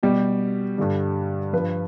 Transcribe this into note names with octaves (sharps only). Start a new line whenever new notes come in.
B2 G3 G4
G2 D3 G3
G2 F3 B4